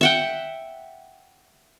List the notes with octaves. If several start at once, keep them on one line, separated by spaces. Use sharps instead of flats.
E5 F#5 G5